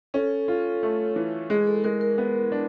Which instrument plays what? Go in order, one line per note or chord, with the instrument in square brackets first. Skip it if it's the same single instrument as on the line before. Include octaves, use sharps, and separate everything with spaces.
[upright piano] C#4 [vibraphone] A4
[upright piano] F4
A3
E3
[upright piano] G#3 [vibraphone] G#4
[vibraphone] A4
[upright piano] G#3 [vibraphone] A#4
[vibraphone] A#4
[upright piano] B3
D4